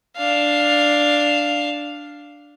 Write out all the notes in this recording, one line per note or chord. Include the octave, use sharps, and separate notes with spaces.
D4 F5